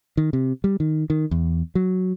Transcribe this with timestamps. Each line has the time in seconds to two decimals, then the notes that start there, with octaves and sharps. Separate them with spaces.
0.17 D#3
0.33 C3
0.64 G3
0.80 D#3
1.10 D#3
1.31 E2
1.75 F#3